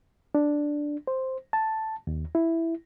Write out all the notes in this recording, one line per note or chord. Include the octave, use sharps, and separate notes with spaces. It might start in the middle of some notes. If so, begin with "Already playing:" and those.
D4
C5
A5
D#2
E4